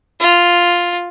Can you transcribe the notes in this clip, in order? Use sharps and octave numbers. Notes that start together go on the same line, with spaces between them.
F4